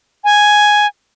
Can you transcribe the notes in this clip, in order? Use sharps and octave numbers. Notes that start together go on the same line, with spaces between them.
G#5